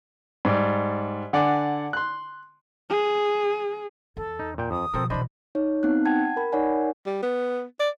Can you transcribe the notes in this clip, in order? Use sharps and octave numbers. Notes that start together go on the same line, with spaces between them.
G#2 G3 D5
D3 D5 F#5 G#5 D6
C6 F#6
G#4
E2 A4
D#4
A#2 G5
F2 D#6
B2 F3 C4 A4 A#4
B2 E3 D4 C5 D#5 B5
D#4 C#5
B3 C4 D#4 F#6
F#5 G5 A5 G#6
A#4 B5
D#4 A#4 C#5 D5 F#5 G#5
G3
B3
D5